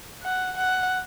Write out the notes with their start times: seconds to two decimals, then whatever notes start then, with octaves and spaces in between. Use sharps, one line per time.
0.23 F#5
0.57 F#5